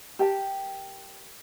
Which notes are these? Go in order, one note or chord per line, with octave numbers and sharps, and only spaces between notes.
G4 A#4 G5 A5